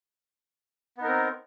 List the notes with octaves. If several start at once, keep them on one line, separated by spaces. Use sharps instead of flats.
B3 C4 D#4 A#4